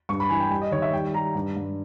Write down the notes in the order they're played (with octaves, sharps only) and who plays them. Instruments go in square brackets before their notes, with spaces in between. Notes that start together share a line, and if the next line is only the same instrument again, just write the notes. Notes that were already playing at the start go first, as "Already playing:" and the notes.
[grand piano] G2 C#6
B5
E3 G#5
G5
G3 G5
D#5
D#3 C#5
E5
G3 G5
G3 A#5
G2
G2